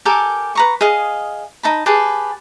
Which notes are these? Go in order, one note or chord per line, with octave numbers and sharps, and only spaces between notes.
G4 A4 A#4 G#5
B4 A#5 C#6
G#4 D#5 F5
D#4 A5 B5
G4 G#4 B4 A5